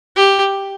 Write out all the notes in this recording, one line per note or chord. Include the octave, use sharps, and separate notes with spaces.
G4